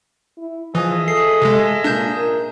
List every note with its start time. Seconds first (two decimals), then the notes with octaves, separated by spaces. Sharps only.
0.38 E4
0.75 E3 F3 G#4 D#5 E5
1.08 A4 C7
1.42 C3 G#3
1.84 A#2 D4 G6
2.17 A#4